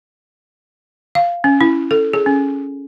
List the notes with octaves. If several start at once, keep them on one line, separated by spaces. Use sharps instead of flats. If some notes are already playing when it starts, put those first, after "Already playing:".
F5
C#4
E4
A4
G#4
C#4